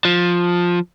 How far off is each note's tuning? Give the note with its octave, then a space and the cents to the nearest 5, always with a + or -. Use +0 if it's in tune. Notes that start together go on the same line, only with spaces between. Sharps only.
F3 +10